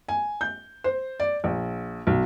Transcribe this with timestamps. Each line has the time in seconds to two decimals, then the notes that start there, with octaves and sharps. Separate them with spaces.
0.08 G#5
0.41 G6
0.84 C5
1.20 D5
1.44 A#1
2.07 B1